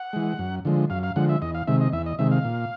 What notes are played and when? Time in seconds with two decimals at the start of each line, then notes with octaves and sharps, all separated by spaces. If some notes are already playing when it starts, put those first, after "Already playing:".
Already playing: F#5
0.13 E3 G#3
0.39 F#2
0.65 D3 F3 G#3
0.90 F#2 F5
1.03 F5
1.16 D3 F3 G#3 F#5
1.29 E5
1.42 E2 D#5
1.55 F5
1.67 C3 D#3 G#3 E5
1.81 D#5
1.93 E2 E5
2.06 D#5
2.19 C3 D#3 G#3 E5
2.32 F5
2.45 A#2